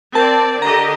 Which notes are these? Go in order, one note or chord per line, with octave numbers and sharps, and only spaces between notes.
C4 A#4 D5 A5 G6
D3 G4 D#5 A#5